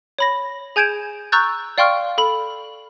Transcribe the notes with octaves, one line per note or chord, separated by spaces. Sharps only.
C#5 B5 A#6
G#4 G#5 G6 G#6 D7 E7
A#5 C#6 E6 F#6 G6 A6
D5 F5 G5 C6 C#6 F6
A4 B5 F#7